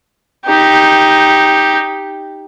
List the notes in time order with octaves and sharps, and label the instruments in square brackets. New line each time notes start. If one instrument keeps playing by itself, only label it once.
[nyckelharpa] D#4 G4